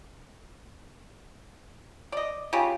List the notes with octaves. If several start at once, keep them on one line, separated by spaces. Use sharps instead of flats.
D5 D#5
C#3 F4 G4